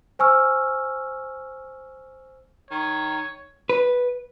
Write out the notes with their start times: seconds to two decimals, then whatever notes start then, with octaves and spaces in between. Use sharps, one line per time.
0.19 C5 G#5 C#6 E6 F6
2.71 D#3 C#5
3.69 B4